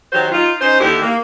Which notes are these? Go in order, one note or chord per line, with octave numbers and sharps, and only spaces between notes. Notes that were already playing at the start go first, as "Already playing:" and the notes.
D#3 F#3 F#4 G4 C5
D#4 F4
C#4 D#4 C5
D#2 D3 E4 G4
A#3